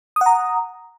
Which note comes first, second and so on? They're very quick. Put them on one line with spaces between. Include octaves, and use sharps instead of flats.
D#6 F#5 A#5